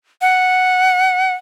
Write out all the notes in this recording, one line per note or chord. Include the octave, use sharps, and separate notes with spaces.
F#5